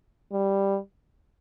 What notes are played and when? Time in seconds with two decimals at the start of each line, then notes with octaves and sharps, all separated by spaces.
0.32 G3